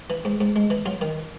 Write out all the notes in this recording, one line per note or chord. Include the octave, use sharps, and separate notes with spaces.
E3
G#2
G#2
G#3
E3
F#3 F4
D#3